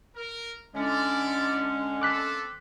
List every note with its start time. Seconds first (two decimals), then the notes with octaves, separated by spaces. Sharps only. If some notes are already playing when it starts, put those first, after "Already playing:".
0.15 A#4
0.75 D3 G#3 C#4 E4 D5
2.02 A#3 C4 A4 D6 F#6 B6